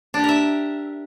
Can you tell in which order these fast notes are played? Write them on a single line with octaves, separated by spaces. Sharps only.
D4 G4 A#4 E5